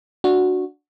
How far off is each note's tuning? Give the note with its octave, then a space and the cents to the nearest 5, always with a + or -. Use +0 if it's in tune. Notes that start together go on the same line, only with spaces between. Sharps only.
D4 +0 F#4 -10